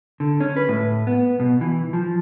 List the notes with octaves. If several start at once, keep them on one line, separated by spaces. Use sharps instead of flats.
D3
C#4
B4
A2
B3
B2
E3
F3